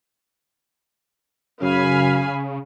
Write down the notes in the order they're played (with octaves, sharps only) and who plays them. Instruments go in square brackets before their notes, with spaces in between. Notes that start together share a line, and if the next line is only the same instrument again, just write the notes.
[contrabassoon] F#2 [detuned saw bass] C#3 [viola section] F5 G#5 B5